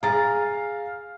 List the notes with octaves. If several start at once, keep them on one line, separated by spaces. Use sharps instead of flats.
G#4 F5 A#5 A6